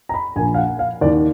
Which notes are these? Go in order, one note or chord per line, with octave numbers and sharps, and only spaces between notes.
A#5
B5
A#1 A#2 G#5
F5
F#5
F5
D#2 D#3 D5